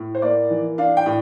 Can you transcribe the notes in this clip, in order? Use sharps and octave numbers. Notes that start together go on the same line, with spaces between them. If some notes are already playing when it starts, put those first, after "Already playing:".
Already playing: A2
C5
A#3 D5
E3
D4 F5
G5
A2